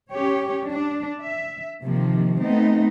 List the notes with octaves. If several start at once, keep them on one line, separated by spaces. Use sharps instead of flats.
C#4 G4 C#5
D4
E5
C3 D#3 F3 A#3
A3 B3 C4 D#4